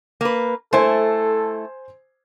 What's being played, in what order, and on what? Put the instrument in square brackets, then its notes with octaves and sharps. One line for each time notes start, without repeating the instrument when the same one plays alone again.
[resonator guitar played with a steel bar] A#3 B4
[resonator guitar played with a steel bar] A3 E4 [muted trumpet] A4 [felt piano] C5 G#5 C6